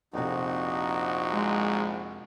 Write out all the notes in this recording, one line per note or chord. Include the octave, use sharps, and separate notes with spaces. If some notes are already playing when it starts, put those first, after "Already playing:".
A#1 F2 C3 D#4 F#4
G#3